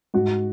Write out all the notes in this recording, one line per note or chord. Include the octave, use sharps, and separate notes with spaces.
G#2 F#4